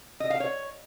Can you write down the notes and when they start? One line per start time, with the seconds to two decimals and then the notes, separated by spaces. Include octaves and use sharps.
0.20 D#5
0.30 F5
0.40 C#5